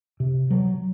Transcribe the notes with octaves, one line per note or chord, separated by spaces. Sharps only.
C3
F#3